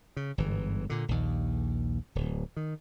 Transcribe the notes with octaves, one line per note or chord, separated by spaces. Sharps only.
C#3
G1 G#2 E3
A#2 D3
A#1 D#2
D1
D#3